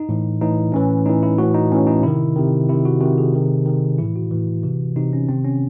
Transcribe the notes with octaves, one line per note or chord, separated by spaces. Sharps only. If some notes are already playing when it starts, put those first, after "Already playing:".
Already playing: D#4
A2 E3
A2 E3 D#4
A2 E3 C#4
A2 E3 D#4
E4
A2 E3 F#4
D#4
A2 E3 C#4
D#4
C3 D#3 E4
C3 D#3
C3 D#3 E4
F#4
C3 D#3 F#4
G#4
C3 D#3
C3 D#3
A2 E3 E4
F#4
A2 E3
C3 E3
C3 E3 D#4
C#4
C3 D#3 C4
C#4